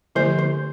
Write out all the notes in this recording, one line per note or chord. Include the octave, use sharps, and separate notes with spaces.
D3 F3 A3 E4 G4 C5
C5